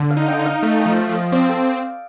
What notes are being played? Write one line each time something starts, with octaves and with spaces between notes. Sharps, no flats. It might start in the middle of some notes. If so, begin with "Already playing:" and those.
Already playing: D3
F5
D#4
G5
D#4
F5
A3 F5
G5
F3
F5
F3
D#5
C4 D5
A4